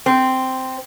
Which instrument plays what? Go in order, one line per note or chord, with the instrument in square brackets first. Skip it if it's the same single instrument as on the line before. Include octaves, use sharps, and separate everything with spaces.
[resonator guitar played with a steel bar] C4